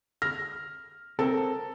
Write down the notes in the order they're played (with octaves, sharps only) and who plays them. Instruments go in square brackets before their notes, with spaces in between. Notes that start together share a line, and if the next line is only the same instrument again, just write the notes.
[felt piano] F6 A#6
[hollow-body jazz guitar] C4 A#4 [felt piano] A4